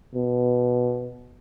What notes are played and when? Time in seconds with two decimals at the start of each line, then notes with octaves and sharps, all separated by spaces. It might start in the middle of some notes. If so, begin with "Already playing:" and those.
0.15 B2